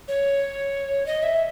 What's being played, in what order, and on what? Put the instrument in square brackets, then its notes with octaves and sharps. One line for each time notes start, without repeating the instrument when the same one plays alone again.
[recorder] C#5
D#5
E5